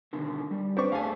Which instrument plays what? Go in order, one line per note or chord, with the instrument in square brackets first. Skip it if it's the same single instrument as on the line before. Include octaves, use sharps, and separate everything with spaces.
[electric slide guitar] B2 D3 D#3
G3
[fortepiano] C4 D4 C#6 [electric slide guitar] B4
[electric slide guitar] A3 G#4 A5 [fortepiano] F5 G#5